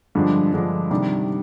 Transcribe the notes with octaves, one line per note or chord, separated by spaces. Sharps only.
G2 D3 F3 G#3 D4
G2 D3 F3 G#3 D4
C3 D#3 G3 D4